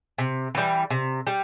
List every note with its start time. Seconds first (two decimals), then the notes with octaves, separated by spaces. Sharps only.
0.18 C3
0.55 E3 G3
0.90 C3
1.27 G3